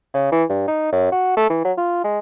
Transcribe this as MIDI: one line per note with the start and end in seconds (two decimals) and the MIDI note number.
0.14 0.28 49
0.32 0.44 52
0.49 0.66 43
0.68 0.90 63
0.92 1.12 42
1.12 1.32 66
1.37 1.49 57
1.50 1.60 52
1.65 1.72 54
1.78 2.02 65
2.04 2.19 56